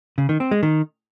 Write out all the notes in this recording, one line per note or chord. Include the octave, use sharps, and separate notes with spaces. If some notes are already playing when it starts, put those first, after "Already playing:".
C#3
D#3
C4
G#3
D#3